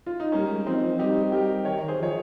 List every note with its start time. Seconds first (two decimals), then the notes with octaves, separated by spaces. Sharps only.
0.06 F4
0.20 D#4
0.32 G3 A#3 C#4
0.49 G#3
0.66 F3 C4 D#4
0.83 F3
0.99 G3 D#4 G4
1.32 G3 G4 A#4
1.65 D#3 A#4 C#5
1.82 D#3
1.88 G#4 C5
1.99 F3 C#5